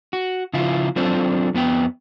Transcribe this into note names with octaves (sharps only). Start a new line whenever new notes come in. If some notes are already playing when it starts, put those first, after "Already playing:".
F#4
C#3 F3 E4 F4
F#3 C4 D4 F4 A4 C5
F2 B3 B4 G5